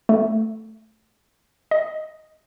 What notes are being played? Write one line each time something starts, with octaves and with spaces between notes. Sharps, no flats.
A3
D#5